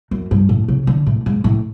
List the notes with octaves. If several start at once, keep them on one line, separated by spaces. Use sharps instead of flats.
F#2
G2
A2
C#3
D3
A2
G#2
A2